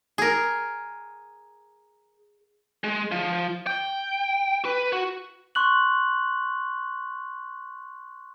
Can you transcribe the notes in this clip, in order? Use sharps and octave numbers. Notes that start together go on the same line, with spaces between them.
G#4 A#4
G#3
F3
G5
B4
F#4
C6 C#6 F#6 F#7